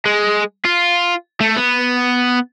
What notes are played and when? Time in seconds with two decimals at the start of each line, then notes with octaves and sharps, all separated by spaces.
0.06 G#3
0.65 F4
1.41 A3
1.56 B3